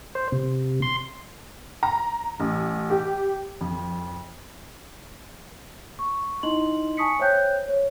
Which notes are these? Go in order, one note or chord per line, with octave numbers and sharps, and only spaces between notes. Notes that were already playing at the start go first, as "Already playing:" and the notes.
C5
C3
C6
A#5
A1
G4
F2
C#6
D#4 E4 D#5 C6 F#7
G#5 A5 C#6 D#6 B6 C#7
C5 C#5 E5 G5 F#6 G6
C#5